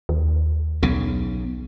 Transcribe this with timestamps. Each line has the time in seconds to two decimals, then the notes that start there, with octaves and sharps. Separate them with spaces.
0.09 D#2
0.83 B1 C#3